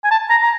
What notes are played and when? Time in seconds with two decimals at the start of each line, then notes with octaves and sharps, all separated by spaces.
0.04 G#5
0.11 A5
0.30 A#5
0.43 A#5